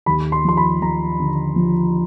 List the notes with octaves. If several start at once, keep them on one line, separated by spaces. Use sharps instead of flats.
D#2 B5
C6
F3 C6
B5
F3 A#5
D3
F3